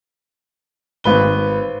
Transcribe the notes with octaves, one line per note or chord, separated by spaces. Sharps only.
G#1 B4 G7